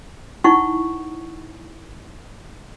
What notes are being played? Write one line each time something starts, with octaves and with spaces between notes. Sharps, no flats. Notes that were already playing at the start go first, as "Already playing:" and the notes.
D#4 E4 F#5 C#6